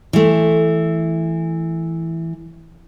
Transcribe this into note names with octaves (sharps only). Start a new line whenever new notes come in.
E3 A3